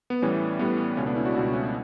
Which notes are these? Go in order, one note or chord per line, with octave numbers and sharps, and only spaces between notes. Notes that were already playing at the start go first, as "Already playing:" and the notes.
B3
A2 E3 G3 C#4
A2 E3 G3 B3
C#2 B2 A3 C#4
B3 D4
C#4 E4
D4 F#4
C#2 B2 A3
C#4
D4